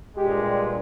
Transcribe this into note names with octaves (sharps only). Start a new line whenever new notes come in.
G2 A#2 G#3 G4